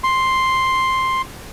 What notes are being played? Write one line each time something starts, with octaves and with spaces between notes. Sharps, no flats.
C6